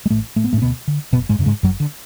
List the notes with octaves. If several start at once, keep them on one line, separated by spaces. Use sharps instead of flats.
G#3
A1 A2 A3
A2 A3
B3
A2 A3
C#4
D2 B2 B3
D3
F#1 B2 B3
G#2 G#3
F#2 C#3
G#2 G#3
F#1 F#2 F#3
D3